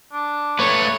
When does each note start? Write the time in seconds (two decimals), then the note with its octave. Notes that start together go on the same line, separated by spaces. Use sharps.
0.13 D4
0.59 A3 B4 C#5